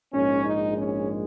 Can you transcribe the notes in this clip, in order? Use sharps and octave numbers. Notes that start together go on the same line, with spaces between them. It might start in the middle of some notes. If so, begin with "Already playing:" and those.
A#1 G#2 G#3 C#4
D#4
C#4